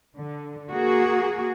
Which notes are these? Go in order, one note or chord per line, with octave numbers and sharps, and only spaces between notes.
D3
A#3 F#4 G#4